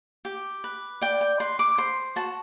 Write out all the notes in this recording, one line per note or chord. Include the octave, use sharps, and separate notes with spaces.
G4
B4
D5 G5
G5
B4 C6
D6
C5 C6
F#4 A5